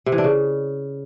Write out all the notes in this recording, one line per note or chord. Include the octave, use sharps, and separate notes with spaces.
C3
E3
D4
C#3